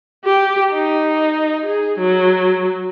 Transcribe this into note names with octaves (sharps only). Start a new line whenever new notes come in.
G4
D#4
G#4
F#3